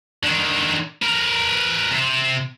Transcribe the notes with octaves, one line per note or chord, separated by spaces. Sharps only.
D3 D#3
A#4 B4
C3